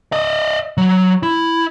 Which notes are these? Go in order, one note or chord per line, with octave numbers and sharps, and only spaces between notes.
D5 D#5
F#3
E4